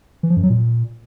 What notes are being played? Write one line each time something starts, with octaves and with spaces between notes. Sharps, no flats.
E3
F3
F#2
F#3
A#2